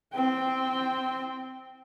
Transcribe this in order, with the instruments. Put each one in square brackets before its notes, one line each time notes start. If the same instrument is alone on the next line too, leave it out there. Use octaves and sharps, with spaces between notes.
[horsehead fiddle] C4 G5